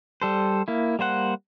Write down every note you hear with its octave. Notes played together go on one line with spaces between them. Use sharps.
G3 A4 C5
A#3 E4
G3 A#3 C5 F#5